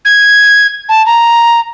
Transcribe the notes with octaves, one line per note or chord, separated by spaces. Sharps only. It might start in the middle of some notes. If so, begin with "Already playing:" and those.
G#6
A5
A#5